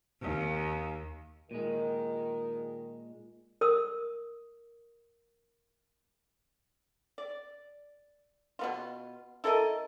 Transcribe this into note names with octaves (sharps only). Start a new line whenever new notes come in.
D#2
A#2 D#3 G#3 A#4
A#4 D#6 E6
D5
B2 B3 F4
E4 A4 A#4 D#5